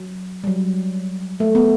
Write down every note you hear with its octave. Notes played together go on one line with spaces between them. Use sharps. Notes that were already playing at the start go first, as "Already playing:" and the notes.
Already playing: F#3
G3
F#3
A3
B3